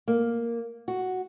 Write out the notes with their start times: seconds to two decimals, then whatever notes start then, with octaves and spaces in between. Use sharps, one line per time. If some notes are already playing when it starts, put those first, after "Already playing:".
0.08 A#3
0.88 F#4